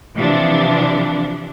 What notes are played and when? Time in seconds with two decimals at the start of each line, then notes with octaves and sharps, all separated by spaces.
0.16 C3 E3 F3 D4